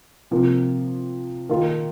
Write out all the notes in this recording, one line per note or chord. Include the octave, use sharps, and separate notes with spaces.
C3 F3 A#3
D#3 A#3 F4